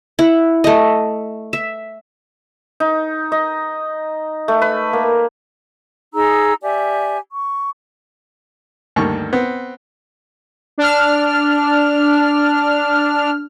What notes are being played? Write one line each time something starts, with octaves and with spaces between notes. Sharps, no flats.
E4 F#5
A3 D#5
E5
D#4
D#5
A3
B4
A#3
D#4 G#4 A#5 E6
G4 D5 E5 G#5
C#6
D2 G2 D#3 A#3 A4 C#6
B3 C4
D4 F6